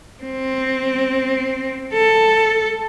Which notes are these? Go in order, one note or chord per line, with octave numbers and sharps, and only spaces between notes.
C4
A4